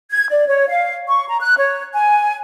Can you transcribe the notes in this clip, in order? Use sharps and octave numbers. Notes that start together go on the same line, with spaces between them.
G#6
D5
C#5
F5
C#6
A#5
F#6
C#5
G#5